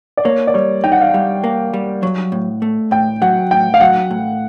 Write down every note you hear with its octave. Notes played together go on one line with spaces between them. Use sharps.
D5
A#3 C#5
D5
G3 C#5
D#4 G5
F#5
F5
G3 F#5
A#3
G3
F#3
A2
A3
A2 G5
F#3 F#5
A2 G5
F5
F#3 F#5
A2